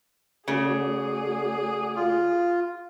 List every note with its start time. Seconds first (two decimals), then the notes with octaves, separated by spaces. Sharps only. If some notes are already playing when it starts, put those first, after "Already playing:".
0.48 C#3 A3 F#4 G#4 D5
1.96 F4